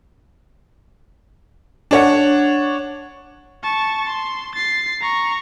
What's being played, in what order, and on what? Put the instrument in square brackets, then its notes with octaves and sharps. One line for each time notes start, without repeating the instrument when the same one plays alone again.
[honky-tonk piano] D4 C#5 F#5
[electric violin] A5 C#6
C6
A6 C7
A#5 C#6